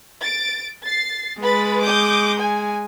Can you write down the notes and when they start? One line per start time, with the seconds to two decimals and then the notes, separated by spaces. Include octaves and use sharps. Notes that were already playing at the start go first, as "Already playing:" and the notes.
0.21 A6 D7
0.83 A6 C7
1.41 G#3 B4 B5 A6
1.81 D6 D#6 G6
2.39 G#5